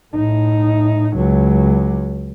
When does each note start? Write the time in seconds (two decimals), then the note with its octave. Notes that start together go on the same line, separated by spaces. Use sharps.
0.15 A2 D#4
1.16 C#2 F#3